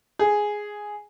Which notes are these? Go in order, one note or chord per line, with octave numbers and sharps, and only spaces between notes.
G#4